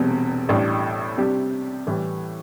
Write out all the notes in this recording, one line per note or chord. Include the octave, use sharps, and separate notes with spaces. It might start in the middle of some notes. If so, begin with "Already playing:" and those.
Already playing: E1 E2 C3 G3
A1 A2 G3 D4
C3 G3 D4 G4
A2 E3 G3